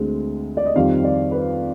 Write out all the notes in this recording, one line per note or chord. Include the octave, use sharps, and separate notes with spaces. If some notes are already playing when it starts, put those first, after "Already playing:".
Already playing: D2 D3 G#3 C4
D5
D#5
F2 D#3 G3 C4 F5
D5
B4